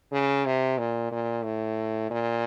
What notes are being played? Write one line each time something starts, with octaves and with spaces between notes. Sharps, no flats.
C#3
C3
A#2
A#2
A2
A#2